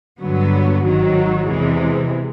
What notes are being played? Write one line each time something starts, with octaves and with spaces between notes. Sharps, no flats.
G2 D3 F#3 B3
G#1 G#2 D#3 F#3
E2 C3 E3 G#3